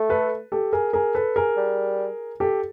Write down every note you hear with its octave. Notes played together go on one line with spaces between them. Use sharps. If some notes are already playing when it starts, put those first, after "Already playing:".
Already playing: A3
A4 B4
G4 A4
G#4 A#4
G#4 A#4
A4 B4
G#4 A#4
G3
G4 A4